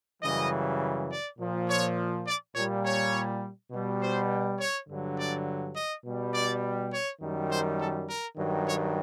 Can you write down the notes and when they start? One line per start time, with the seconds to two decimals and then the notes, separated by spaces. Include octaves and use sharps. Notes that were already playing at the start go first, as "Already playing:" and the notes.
0.22 F#2 C#3 E3 G3 D#5
1.10 D5
1.39 A#2 F3
1.67 C#5
2.27 D5
2.55 A#2 G3 C#5
2.85 C#5
3.71 B2 G3
4.01 C5
4.59 C#5
4.89 G2 D3 F#3
5.17 D5
5.75 D#5
6.04 B2 G3
6.34 D5
6.92 C#5
7.21 F#2 D#3 G3
7.49 C5
7.78 A4
8.08 A#4
8.37 G2 D#3 F#3
8.67 C#5